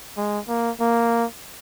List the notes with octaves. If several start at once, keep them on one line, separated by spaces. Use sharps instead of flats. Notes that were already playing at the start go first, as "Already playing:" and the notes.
G#3
A#3
A#3